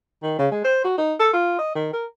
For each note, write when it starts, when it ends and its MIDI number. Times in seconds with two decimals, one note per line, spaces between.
0.23 0.38 51
0.39 0.48 49
0.51 0.64 56
0.64 0.81 72
0.84 0.97 66
0.98 1.14 63
1.20 1.29 69
1.33 1.58 65
1.59 1.73 75
1.75 1.90 51
1.93 2.06 70